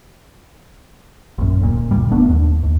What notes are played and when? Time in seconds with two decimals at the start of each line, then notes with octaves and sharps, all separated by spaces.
1.38 A#1 F#2
1.61 D1 C2 A#2
1.91 G1 D2 A#2 G3
2.11 E1 A3 B3 D4
2.29 D#2
2.63 D#2